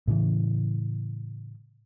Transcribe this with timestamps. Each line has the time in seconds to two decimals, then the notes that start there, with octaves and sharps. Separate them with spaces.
0.08 A2 C#3 E3